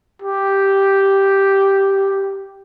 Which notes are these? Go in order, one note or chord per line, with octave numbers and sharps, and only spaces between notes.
G4